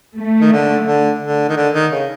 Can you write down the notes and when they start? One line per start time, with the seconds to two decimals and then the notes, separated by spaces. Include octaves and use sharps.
0.17 A3
0.41 D#3
0.53 D3
0.87 D3
1.23 D3
1.49 D#3
1.57 D3
1.74 D#3
1.92 C#3